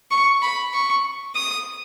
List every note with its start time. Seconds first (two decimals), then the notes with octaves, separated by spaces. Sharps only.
0.11 C#6
0.42 B5
0.73 C#6
1.35 D#6